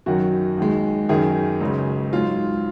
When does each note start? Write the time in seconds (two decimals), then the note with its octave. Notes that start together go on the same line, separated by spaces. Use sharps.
0.06 F#2 D#3 F#3 F#4
0.57 D#2 D#3 G#3
1.09 F#2 D#3 F#3 G#4
1.61 C#2 C#3 F#3
2.12 G#2 F#3 F4